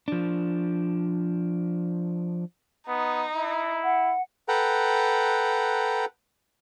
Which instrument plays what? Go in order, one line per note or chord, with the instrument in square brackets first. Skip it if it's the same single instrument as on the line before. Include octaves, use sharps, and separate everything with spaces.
[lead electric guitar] F3 D4
[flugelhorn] B3 [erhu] D#4
[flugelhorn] E4
[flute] F#5
[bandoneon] A4 B4 F#5 G5 A#5